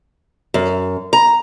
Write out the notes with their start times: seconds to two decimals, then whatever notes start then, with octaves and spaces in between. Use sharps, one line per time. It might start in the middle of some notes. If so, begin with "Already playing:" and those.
0.54 F#2
1.13 A#5